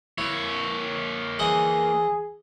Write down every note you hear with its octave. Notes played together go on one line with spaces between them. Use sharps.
A#3 E4 C#5
E3 G#4 D#5 F#5